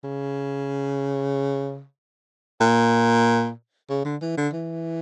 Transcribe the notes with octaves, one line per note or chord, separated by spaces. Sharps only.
C#3
A#2
C#3
D3
E3
D3
E3